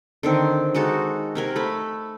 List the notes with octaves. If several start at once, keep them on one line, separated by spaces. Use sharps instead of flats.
D3 D#3 C4
G#3 D#4 F#4 A4
C3 A#4 G#5
A3 B5